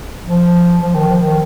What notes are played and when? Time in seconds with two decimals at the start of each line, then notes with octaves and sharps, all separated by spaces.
0.24 F3
0.80 F3
0.95 D#3
1.08 F3
1.22 D#3